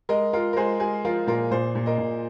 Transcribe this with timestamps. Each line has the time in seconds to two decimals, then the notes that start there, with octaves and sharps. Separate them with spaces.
0.09 G#3 A#4 D#5
0.33 G#3 F4 A#4
0.53 A#4
0.56 G#3 G#4 C5
0.80 G#3 G#4
1.05 F3 F4 A#4
1.27 A#2 F4 A#4
1.51 A#2 G#4 C5
1.75 A#2
1.86 A#4 D#5
1.98 A#2